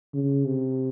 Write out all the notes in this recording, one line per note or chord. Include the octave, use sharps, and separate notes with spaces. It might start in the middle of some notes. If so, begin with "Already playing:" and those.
C#3
C3